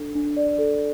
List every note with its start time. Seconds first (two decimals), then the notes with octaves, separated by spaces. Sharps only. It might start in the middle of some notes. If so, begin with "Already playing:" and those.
Already playing: D4 A4
0.15 D4
0.37 D5
0.58 A4